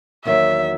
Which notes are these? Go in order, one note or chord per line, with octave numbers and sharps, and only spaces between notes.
E2 D#3 F#3 A#3 E5